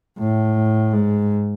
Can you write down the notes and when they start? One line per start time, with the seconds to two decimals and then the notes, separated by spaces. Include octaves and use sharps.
0.19 A2
0.93 G#2